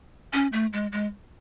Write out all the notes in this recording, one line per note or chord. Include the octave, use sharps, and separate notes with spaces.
C#4
A3
G#3
G#3